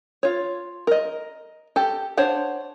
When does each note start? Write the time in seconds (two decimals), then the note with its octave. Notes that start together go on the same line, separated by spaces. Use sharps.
0.23 F4 C#5
0.87 A#4 D#5
1.76 G4 A4
2.17 D4 C5 C#5 F#5